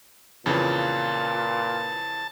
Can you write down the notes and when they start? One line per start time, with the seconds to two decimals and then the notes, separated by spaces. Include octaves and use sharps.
0.46 F2 A#2 C#3 E3 F4 A5